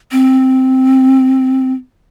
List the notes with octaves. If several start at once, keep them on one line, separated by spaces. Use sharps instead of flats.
C4